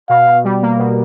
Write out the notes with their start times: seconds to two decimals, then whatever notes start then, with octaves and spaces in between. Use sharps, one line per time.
0.09 B2 F5
0.26 B2
0.44 G3
0.62 A#3
0.79 B2